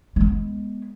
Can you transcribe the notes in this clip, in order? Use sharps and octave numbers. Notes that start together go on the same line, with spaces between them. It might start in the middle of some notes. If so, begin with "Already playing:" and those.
G#3 B3